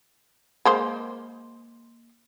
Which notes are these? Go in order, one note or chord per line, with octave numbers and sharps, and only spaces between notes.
G#3 A#3 C5